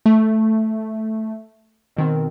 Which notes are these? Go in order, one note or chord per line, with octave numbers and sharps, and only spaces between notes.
A3
B2 D#3 C4